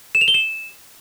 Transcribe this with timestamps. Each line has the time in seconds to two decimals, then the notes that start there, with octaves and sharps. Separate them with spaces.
0.15 E7
0.21 F7
0.28 G7
0.34 E7